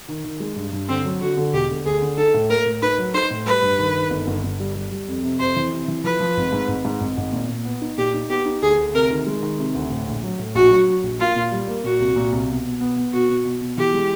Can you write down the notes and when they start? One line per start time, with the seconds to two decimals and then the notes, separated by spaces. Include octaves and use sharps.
0.08 D#3
0.24 D#3
0.40 G#3
0.56 G2
0.73 G2
0.89 D3 C4
1.05 F#3
1.21 D3 F#4
1.37 D3
1.53 E1 G4
1.69 D3
1.85 D2 G#4
2.01 D3
2.17 D#4 A4
2.34 A2
2.49 A#3 A#4
2.66 A2
2.82 D#4 B4
2.98 F#3
3.14 D#4 C5
3.31 A2
3.46 G3 B4
3.62 G2
3.78 D#3
3.95 D#3
4.10 G1
4.27 G1
4.43 G1
4.60 G3
4.75 G3
4.91 G3
5.08 F2
5.24 C3
5.39 F2 C5
5.56 E3
5.72 C3
5.88 E3
6.04 F3 B4
6.20 F3
6.37 G#1
6.52 G#2
6.68 G#1
6.85 G#2
7.01 G#1
7.17 G#1
7.33 A#2
7.49 A#2
7.65 B3
7.81 D#4
7.98 A#2 G4
8.14 D#4
8.29 B3 G4
8.46 D#4
8.62 D2 G#4
8.78 D2
8.94 C3 A#4
9.10 D#3
9.27 G#3
9.43 D#3
9.59 C3
9.75 D2
9.91 A2
10.07 A#1
10.23 F#3
10.39 A2
10.55 A#1 F#4
10.71 F#3
10.88 F#3
11.03 A#1
11.19 A#3 F4
11.36 A#2
11.52 G3
11.67 A#3
11.84 A#2 F#4
12.00 C2
12.16 A#2
12.32 C2
12.48 B2
12.65 B2
12.81 B3
12.97 B3
13.13 B2 F#4
13.29 B2
13.45 B2
13.61 B2
13.77 E3 G4
13.93 G#3